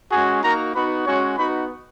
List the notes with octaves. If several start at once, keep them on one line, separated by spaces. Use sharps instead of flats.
G#3 C#4 F#4 G#4 G#5
A#3 D#4 F#4 A#4 A#5
B3 D#4 F#4 B4 B5
G#3 C#4 F#4 C#5 C#6
B3 D#4 F#4 B4 B5